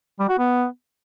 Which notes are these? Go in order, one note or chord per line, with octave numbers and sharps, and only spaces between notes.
G3
F#4
B3